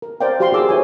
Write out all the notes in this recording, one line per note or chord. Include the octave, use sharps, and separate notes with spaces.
A#4
A#4 C5 D5 F5 G5
F#4 G4 C5 F5 C6
E4 G#4 D6 E6
E4 B4 C#5 G#5